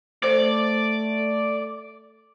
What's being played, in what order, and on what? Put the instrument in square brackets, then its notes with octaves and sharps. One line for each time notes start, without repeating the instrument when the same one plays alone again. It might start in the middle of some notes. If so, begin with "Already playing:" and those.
[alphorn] A3 [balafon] C5 [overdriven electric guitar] D5